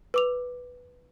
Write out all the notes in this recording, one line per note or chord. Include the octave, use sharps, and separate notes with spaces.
B4 D6 F7